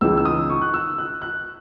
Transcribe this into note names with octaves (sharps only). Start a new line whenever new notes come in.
C#2 C#3 E3 G#3 D#4 E6
E6
D#6
C#6
F#6
E6
F#6
F#6